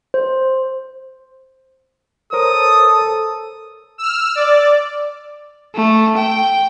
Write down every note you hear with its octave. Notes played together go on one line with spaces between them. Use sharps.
C5
A4 A#4 C5 C#5 D#6
E6 F6
D5
A3
G5